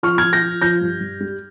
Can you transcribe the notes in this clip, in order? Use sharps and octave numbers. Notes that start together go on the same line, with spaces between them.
F3 C#6 F6
F3 F6 G#6
G6 A#6
F3
F3 G6 A#6
G2
G2
G3